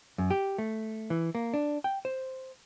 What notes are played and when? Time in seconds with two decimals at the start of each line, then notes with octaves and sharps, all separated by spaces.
0.18 F#2
0.31 G4
0.58 A3
1.10 E3
1.35 A#3
1.54 D4
1.84 G5
2.05 C5